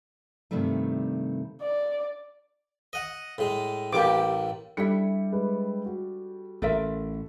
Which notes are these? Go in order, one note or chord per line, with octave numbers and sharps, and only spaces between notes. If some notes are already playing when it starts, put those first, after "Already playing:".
G2 C3 D#3 G3 A3
D5
D#5 F#5
A2 G#3
A1 A2 A#3 G4 D6
G3 D4 E4 A4 E5 C#7
G#3 B4
F#4
A1 F4 A4 A#4 E5